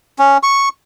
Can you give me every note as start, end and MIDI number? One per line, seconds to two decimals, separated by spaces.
0.19 0.38 61
0.43 0.69 85